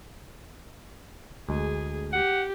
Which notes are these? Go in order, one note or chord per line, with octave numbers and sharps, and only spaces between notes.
D2 G#3 G#4
G4 F#5